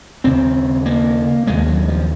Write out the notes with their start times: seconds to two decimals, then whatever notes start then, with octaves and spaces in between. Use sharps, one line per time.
0.24 D#2 C#3 C4
0.86 A#3
1.47 D#2 C#3 G#3
1.67 F#3
1.88 F3